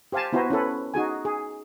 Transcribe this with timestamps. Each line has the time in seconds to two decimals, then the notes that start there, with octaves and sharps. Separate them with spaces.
0.12 G4 C5 F5 G#5 A5
0.33 B3 E4 F#4 C5 G#5 A#5
0.50 C#4 E4 A4 B4
0.94 D#4 F#4 G#4 G#5
1.25 G#4